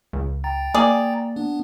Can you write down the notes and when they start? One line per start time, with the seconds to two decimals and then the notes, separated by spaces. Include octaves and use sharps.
0.13 C#2
0.44 G5 A#5 A6
0.74 A#3 G#4 D5
1.36 B3 D4